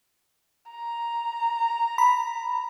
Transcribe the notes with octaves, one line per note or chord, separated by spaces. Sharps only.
A#5
B5